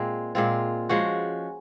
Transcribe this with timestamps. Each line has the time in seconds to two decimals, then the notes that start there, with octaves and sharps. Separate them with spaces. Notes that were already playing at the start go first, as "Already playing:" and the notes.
Already playing: A#2 G#3 C4 F4
0.35 A#2 G#3 C4 F4
0.89 F3 G#3 C#4 F#4